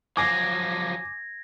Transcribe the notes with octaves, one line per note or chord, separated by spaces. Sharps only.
F3 F#3 G#5 D6 G#6 A#6